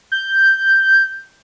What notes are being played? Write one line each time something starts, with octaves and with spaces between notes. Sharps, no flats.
G6